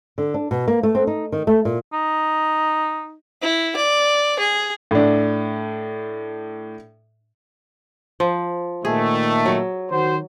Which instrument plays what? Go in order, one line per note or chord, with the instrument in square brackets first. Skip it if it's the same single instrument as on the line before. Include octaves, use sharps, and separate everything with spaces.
[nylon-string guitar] D3
D4
B2
A#3
A3
C4
D#4
D#3
A3
A#2
[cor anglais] D#4
[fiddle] E4
D5
G#4
[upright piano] A2 D4
[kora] F3
[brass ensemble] A#2 D#3 A3 [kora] G#4
[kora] F#3
[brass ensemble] D#3 F#4 C5